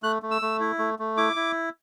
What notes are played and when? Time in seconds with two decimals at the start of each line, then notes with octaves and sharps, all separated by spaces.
0.03 A3 F#6
0.22 A3
0.31 E6
0.42 A3
0.60 E4
0.79 A3
0.99 A3
1.17 E4 D6
1.36 E4